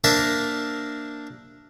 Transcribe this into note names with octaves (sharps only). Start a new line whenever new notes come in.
A#3 D4 A#4 C5 E5 A5